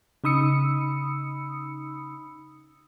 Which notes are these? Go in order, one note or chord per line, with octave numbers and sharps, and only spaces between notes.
C#3 D#4 B5 D#6 E6 C#7